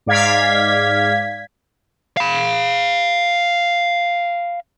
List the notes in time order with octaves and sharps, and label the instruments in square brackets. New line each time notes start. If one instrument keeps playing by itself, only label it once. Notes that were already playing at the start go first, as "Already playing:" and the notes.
[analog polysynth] G#2 D5 F5 G#6 B6
[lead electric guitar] F5 B5